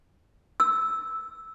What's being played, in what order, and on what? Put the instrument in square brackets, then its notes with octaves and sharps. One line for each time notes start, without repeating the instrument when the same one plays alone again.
[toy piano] E6